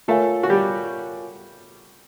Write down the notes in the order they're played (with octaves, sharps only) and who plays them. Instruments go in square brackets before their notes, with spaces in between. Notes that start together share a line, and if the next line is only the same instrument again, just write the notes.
[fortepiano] A3 A4 [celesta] F4 A#4 C#5 F5 G#5
[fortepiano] F#4
G3 G4